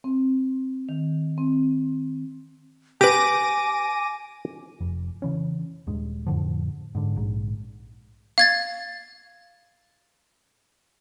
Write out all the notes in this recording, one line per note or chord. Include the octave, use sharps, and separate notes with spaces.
C4
D#3
C4
G4 B4 G#5 D6 A#6 D#7
F1 F2
C#3 E3 C#4
D#1 G2 G#3
F2 A2 D3 F3
G#2 D3
A#1 G#2
F5 G#6 A6